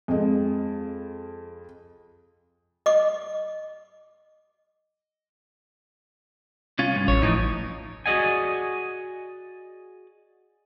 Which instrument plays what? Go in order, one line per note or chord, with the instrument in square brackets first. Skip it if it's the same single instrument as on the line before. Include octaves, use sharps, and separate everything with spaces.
[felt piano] F2 G#3
[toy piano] D#5 D6
[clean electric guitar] C2 C#4 F4
G2
[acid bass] A1 [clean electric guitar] C#5
[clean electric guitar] A2 E3 F3 [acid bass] D#4
[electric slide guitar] F#4 G#4 D5 D#5 F#5 G#5